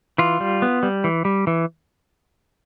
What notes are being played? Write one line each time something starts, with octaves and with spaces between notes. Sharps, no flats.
E3 F4
G3
B3
G3
E3
G3
E3